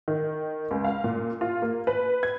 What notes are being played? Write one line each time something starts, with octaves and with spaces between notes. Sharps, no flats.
D#3
C#2
F5
A#2
F4
A#3
B4
G#6